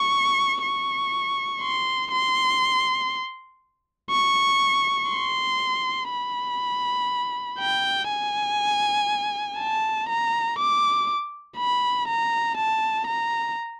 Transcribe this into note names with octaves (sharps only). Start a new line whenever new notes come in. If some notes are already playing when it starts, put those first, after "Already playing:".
Already playing: C#6
C#6
C6
C6
C#6
C6
B5
G5
G#5
A5
A#5
D6
B5
A#5
A5
A#5